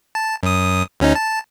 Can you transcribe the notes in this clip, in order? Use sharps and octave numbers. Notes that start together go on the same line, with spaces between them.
A5
F#2 D#6
D2 C#4 D#4
A5